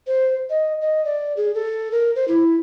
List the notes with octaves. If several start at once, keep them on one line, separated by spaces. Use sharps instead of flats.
C5
D#5
D#5
D5
G#4
A4
A#4
C5
E4